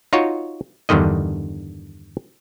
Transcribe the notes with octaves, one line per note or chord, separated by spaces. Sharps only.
D#4 F4 F#4 C#5
E2 G2 D3 D#3 D#5